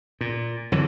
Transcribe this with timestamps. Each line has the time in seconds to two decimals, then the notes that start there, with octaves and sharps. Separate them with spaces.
0.21 A#2
0.72 F2 D3 E3 F#3